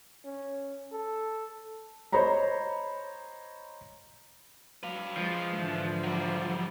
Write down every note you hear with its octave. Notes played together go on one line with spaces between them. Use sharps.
C#4
A4
C5 C#5 D#5 A#5 B5
F#3 B4 F5
F3 G#3
G#2 D3 E3
F#3 G3